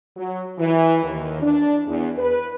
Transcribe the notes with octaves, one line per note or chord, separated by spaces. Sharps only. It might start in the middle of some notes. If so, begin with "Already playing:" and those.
F#3
E3
D#2
D4
E2
B4